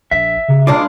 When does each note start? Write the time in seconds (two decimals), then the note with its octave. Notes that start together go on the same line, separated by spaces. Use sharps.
0.11 A#1 E5
0.48 C#3
0.67 G2 G#3 D4 F4 D6